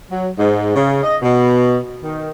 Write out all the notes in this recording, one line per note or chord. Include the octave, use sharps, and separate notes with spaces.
F#3
G#2
C#3
D#5
B2
D#3